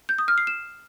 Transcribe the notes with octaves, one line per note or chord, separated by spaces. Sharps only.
G6
D#6
F6
C7
E7